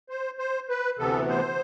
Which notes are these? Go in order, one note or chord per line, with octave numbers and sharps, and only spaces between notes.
C5
C5
B4
D2 C3 E3 B3 A4
C5